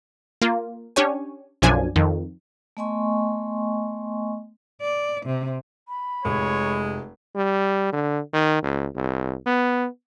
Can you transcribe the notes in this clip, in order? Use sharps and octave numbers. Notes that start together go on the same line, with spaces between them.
A#3 F4
C#4 D4 G4 C#5 G#5
B1 F#2 B2 F3 D4 G#5
F2 D#3
A3 B3 D#5 G#5 C6 C#6
D5
C3
B5
F1 G#3 C#5
G3
D3
D#3
C#2
C2
B3